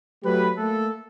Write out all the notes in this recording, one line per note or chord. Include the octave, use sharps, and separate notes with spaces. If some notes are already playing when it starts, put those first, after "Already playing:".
F#3 A3 G4 B4
A3 A#3 A4